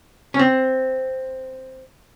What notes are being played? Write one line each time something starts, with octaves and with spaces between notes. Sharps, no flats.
C#4
C4